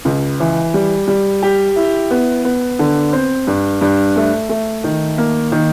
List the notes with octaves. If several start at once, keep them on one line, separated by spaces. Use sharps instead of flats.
C#2
E3
G3
G3
G4
E4
B3
B3
D3
C4
G2
G2
A3
A3
D#3
A#3
D#3